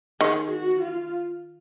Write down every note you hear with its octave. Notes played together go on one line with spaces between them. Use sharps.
D#3 G#4
F#4
F4